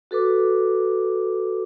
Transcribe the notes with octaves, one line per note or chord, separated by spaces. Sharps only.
F#4 A4 B4 D6